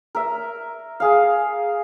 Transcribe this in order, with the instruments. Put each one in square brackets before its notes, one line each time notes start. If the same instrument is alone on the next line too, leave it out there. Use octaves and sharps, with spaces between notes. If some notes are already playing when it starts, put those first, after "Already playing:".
[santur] A#4 E5
G#4 F5